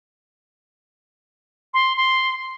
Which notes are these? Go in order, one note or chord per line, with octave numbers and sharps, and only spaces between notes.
C6
C6